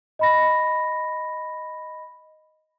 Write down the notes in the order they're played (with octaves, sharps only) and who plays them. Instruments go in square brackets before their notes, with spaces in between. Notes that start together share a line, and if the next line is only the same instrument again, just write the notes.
[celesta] D#5 B5 A#6